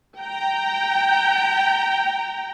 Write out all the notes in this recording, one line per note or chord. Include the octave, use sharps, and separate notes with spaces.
G5 A#5